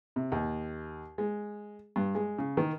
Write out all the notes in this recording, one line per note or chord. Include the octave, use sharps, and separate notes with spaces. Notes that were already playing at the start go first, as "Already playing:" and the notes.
C3
D#2
G#3
G2
G#3
C#3
D#3